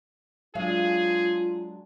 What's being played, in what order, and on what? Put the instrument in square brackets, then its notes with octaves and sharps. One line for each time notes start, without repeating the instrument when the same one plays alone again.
[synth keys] F#3 G#3 D4 [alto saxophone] F4 [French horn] G#4 [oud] F5